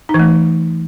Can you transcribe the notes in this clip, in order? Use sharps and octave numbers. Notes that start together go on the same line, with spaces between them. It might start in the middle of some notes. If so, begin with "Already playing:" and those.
D#4
E3
A3